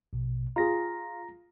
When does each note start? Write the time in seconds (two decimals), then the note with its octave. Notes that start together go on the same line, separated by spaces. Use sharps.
0.13 A#1 B2
0.56 F4 G#4 A#5 A#6